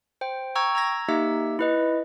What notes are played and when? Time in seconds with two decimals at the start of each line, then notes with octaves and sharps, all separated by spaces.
0.21 C5 G5
0.55 G5 A#5 C#6 E6 G#6
0.75 A#5 E6 G#6 A#6
1.08 A#3 D#4 G4 E5 E6
1.59 E4 B4 D#5